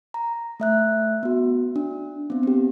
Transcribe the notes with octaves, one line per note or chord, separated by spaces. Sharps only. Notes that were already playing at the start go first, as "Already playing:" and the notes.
A#5
A3 E5 F#6
B3 F#4
D4
B3 C4
C4 G4